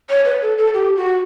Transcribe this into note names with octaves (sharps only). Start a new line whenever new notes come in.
C#5
B4
A4
A4
G4
F#4